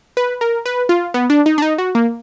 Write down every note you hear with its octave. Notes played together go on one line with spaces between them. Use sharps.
B4
A#4
B4
F4
B3
D4
D#4
D4
D#4
F#4
A#3